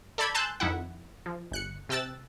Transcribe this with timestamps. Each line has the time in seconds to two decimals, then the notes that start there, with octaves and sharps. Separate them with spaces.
0.18 A4 D5 A5 B5 G6 G#6
0.34 G#5 A5 C6 E6 F#6 G6
0.60 F2 D#3 E4 F#5
1.26 F3
1.52 G1 F#6 C#7
1.89 C3 G5 A5 E6 F#6 A6